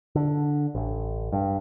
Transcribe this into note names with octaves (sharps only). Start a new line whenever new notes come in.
D3
A1
G2